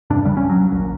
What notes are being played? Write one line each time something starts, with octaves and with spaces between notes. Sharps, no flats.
E1 G2 C3 D4
A#1 C#3 G3
D1 C#4
F#3
A#1 D#2